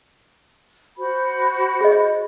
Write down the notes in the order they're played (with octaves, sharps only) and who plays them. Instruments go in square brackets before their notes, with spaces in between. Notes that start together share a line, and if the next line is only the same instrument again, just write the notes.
[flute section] F#4 C5 B5
[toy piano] G#4 D#5